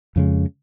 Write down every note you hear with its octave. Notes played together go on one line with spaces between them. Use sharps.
F2 C#3 G#3